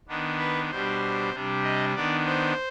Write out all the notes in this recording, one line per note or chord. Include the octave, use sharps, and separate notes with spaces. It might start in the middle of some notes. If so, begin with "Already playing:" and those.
D#3 B3 D4
B4
B2 G3 D4 C5
C3 G3 D4
D#5
D#3 B3 D4 D5
C5